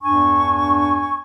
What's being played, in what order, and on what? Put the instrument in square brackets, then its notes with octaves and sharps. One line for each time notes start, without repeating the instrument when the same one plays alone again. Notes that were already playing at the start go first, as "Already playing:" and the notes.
[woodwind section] E2 G2 D4 G#5 C#6